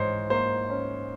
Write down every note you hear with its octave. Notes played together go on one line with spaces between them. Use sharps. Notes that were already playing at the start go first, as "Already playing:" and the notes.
Already playing: G#2 E3 C5 C#5
A#3 C5
C#4